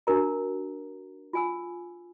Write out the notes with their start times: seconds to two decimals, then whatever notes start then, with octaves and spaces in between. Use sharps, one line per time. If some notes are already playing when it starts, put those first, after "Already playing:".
0.07 D4 F#4 A#4 A#5
1.33 F4 G#5 E6